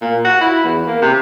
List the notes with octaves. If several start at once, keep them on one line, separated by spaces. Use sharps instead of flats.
A#2
F#4
E4
E2
A#3
C3